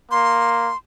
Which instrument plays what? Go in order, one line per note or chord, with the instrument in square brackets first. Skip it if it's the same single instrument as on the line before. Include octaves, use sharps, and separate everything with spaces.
[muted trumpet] A#3 [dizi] C6